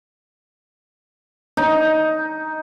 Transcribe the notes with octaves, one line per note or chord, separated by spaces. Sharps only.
D#4